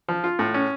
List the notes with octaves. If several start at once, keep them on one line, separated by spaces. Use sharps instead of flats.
F3
F4
A2
C#4